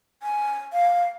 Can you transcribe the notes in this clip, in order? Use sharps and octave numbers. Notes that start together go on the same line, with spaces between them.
G#5
F5